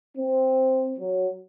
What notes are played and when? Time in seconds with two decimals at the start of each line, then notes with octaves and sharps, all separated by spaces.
0.18 C4
0.98 F#3